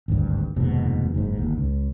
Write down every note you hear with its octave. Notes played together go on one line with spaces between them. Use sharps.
G#1 D2 G2
F1 D#2 G#2 B2
F#1 G#2
G1 D#2
C#2